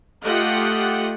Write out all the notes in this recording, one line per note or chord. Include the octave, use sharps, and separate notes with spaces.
A3 F4 G4 D#5 F#5